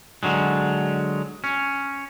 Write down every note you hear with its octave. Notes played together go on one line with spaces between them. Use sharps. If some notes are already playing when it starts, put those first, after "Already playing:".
D3 F#3 G#3
C#4